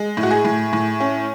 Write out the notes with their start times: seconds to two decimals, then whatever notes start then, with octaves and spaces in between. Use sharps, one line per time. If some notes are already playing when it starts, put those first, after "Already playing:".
Already playing: G#3
0.17 A2
0.23 F#4
0.31 G#4
0.45 A2
0.73 A2
1.00 C#4